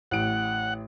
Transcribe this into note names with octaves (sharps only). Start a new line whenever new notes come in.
A1 A2 F#5 D7